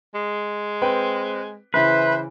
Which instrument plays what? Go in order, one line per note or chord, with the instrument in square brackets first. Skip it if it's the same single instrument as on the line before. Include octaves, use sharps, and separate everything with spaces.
[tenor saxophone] G#3
[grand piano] C4 B4 G5
[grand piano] C#3 E3 [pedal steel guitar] B4 [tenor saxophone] C5 [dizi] E5